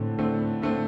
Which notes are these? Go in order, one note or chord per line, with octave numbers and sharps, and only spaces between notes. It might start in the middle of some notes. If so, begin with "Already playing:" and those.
Already playing: A2 D3 A3 C4
D3 A3 C4
D3 A3 C4